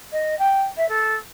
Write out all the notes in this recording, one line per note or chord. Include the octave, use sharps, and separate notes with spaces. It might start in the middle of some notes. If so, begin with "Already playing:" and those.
D#5
G5
E5
A4